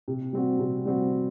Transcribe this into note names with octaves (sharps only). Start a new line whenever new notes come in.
C3
G3 C4 F#4
C3
G3 C4 F#4